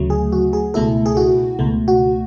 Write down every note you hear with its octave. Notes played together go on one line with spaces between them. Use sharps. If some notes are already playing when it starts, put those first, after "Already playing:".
Already playing: D2 C#3 F#3 A3
G#4
F#4
G#4
C#2 B2 A3 E4 A4
G#4
F#4
C#2 B2 A3
F#4